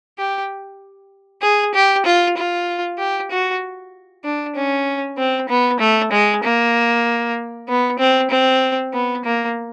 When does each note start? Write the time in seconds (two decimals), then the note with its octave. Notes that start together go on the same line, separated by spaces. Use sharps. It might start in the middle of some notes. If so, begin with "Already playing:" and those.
0.18 G4
1.42 G#4
1.74 G4
2.06 F4
2.37 F4
2.98 G4
3.31 F#4
4.24 D4
4.56 C#4
5.17 C4
5.49 B3
5.80 A3
6.12 G#3
6.43 A#3
7.68 B3
7.99 C4
8.31 C4
8.93 B3
9.25 A#3